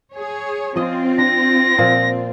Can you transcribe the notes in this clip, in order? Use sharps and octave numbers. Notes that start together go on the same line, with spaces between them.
G#4 C#5
F3 C4 C#4 F4 D#5
D4 A#6
A#2 F3